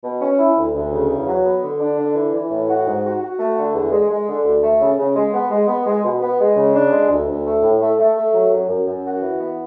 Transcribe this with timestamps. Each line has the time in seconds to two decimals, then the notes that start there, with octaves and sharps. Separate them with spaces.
0.04 B2
0.21 C#4
0.39 E4
0.57 D2
0.75 D2
0.92 C#3
1.10 E2
1.27 F#3
1.45 B3
1.63 D3
1.80 D4
1.98 D3
2.16 E3
2.33 E3
2.51 A2
2.69 F#4
2.87 G#2
3.05 F#4
3.22 F#4
3.39 A3
3.57 D3
3.75 E2
3.92 G#3
4.10 G#3
4.28 D3
4.45 D2
4.63 A3
4.81 C#3
4.98 C#3
5.16 G#3
5.34 B3
5.51 G#3
5.68 B3
5.86 G#3
6.04 B2
6.22 B3
6.39 G#3
6.57 C#3
6.75 D4
6.92 G#3
7.10 D2
7.28 D2
7.46 A3
7.63 A2
7.80 A3
7.98 A3
8.16 A3
8.34 F#3
8.52 F#2
8.69 F#2
8.87 F#2
9.04 F#4
9.22 E3
9.40 B3